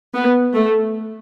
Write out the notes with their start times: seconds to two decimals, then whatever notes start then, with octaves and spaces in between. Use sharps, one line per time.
0.14 B3
0.54 A3